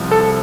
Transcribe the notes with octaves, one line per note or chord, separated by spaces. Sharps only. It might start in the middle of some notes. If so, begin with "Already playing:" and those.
Already playing: C2 F3
A4